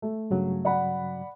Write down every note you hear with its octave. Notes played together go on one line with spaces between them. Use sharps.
A3
G2 C#3 F#3
D5 F#5 B5